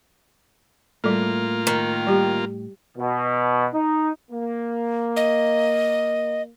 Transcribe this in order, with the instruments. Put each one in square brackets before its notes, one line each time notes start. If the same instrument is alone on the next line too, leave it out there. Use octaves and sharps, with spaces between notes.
[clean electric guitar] A2 [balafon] G3 A4 [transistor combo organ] A#3 F4
[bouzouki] D#3
[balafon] G3 G4
[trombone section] B2
D#4
A#3
[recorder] D#5